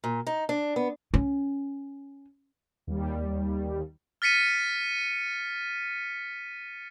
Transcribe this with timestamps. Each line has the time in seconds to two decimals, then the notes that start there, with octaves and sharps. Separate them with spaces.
0.04 A#2
0.27 D#4
0.49 D4
0.76 B3
1.14 C#4
2.87 D#2 G3
4.22 F6 A6 B6 C#7 D#7